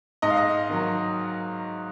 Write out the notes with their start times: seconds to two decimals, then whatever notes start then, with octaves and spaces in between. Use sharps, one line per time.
0.22 G#2 D#5
0.30 F5
0.37 D#5
0.70 D#3 F#3